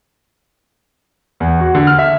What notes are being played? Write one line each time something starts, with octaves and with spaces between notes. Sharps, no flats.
E2
F#4
D3
F6
E5